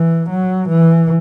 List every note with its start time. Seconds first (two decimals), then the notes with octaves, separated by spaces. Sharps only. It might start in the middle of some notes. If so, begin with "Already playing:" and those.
Already playing: E3
0.30 F#3
0.69 E3